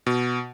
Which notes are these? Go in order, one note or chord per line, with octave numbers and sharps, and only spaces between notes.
B2